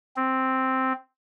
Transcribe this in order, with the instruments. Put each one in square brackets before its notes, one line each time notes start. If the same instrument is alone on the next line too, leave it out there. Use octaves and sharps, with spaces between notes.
[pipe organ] C4